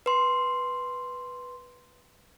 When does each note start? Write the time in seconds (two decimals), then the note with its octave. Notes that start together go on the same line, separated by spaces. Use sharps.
0.06 B4 C6